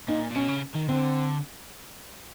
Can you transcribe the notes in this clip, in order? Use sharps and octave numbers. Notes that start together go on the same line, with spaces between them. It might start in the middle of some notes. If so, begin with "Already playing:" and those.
A#2 D#4
A#2
B2 C#4
C#3
D#3
D3 C4